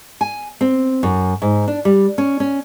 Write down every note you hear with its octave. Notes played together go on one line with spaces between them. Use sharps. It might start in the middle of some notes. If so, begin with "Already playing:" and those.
G#5
C4
F#2
G#2
D4
G3
C#4
C#4